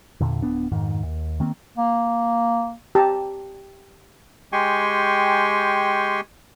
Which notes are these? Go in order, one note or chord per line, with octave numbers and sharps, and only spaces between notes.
E2 A#2 D3
D1 B3 D4
F2 G#2 D#3
D#2
D#3 A#3 C4
A#3
G4 A5 A#5
G#3 G4 G5 G#5 C6 C#6